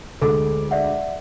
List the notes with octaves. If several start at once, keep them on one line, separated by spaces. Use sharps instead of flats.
D2 G#3 A4 D6
D5 E5 F#5